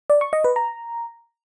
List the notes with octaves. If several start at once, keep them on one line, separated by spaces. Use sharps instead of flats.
D5
C#6
D#5
B4
A#5